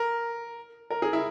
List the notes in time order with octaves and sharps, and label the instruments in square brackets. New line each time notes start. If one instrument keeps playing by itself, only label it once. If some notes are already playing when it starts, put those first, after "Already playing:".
Already playing: [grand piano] A#4
A#4
G#4
E4